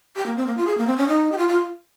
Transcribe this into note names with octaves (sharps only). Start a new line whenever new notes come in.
G4
A#3
C4
A#3
F4
G#4
A#3
C4
C#4
D#4
G4
F4
F4